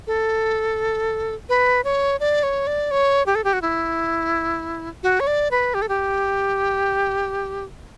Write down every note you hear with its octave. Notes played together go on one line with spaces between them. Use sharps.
A4
B4
C#5
D5
C#5
D5
C#5
G4
A4
G4
F#4
E4
F#4
C#5
D5
B4
G4
A4
G4